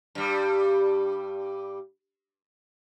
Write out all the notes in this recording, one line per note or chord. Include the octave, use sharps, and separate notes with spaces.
G2 G3